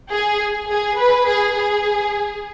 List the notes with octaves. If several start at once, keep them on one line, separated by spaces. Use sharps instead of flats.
G#4
G#4
B4
G#4
G#4